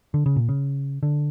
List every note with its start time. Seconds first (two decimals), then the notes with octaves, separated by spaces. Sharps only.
0.14 D3
0.26 C#3
0.36 A#2
0.49 C#3
1.03 D3